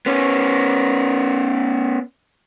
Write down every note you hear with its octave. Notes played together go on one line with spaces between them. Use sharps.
B3 C#4